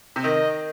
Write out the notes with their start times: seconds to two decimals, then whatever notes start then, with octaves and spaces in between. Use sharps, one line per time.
0.16 C3
0.24 D#3 D#5